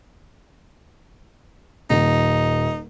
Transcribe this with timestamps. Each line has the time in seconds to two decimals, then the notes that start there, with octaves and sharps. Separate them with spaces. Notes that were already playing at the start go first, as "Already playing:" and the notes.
1.90 D#1 D#4